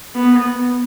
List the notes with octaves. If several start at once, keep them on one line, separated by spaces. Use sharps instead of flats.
B3